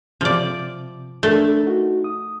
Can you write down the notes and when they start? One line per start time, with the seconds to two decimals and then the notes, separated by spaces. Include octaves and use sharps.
0.21 C3 F3 D5 D6
1.23 A3 D4 A#4
1.63 D#4 F#4
2.04 D#6